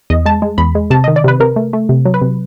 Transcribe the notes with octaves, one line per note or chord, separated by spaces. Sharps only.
E2 D#5
G#3 A5
G#3
E2 B5
G#3
C3 A5
D#5
D#3
D5
C3 B4
C3 A#4
A3
A3
C3
F#3
B4
C3